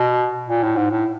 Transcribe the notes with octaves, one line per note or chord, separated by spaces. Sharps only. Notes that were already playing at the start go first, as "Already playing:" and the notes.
Already playing: B2
A#2
A2
G#2
A2